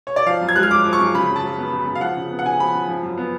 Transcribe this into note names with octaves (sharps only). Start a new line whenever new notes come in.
C#5
D5
F3 F5
F#2
G#6
G#3 F#6
F6
F#2 D6
F3
C#6
F#2
C#3 B5
F#2
A5
F#3
B3
C#3
F#2
F5
F3 F#5
C#3
B3
F#5
C#3 G#5
F3 B5
C#3
F3
F#2
B3